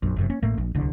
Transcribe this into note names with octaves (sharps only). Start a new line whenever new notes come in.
A#1 F#2
F#1 F#2 C3
A#3 C#4
A1 A2 A3 A#3
A#1
D1 C2 D3